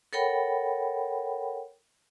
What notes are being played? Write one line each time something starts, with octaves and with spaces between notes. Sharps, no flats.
A4 A#4 C#5 F#5 G5 B5